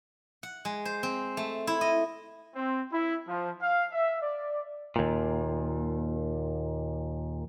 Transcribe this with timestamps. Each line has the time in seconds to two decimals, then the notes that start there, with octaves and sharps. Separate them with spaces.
0.43 F#5
0.65 G#3
0.85 C5
1.03 C4
1.37 A3
1.67 E4
1.81 D#5
2.55 C4
2.91 E4
3.28 F3
3.61 F5
3.91 E5
4.22 D5
4.96 D#2 A#2